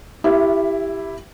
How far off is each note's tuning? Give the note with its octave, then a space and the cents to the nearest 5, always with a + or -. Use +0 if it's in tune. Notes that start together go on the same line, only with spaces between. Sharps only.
E4 +0 G4 +0 E5 +30